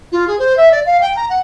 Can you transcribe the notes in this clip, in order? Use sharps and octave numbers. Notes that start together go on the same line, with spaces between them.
F4
G#4
C5
E5
D5
F5
G5
A#5
F#5